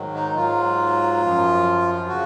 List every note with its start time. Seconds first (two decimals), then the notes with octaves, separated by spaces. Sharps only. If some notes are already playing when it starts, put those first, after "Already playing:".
Already playing: G#2 D#3 F#3
0.15 D#4
0.36 G#2 F#3 F4
1.22 F#2 F3
2.08 C#3 F#4